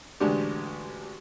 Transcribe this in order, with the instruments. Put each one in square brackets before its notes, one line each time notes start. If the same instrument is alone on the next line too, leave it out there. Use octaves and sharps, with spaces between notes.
[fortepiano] A1 D2 G#3 D4 G4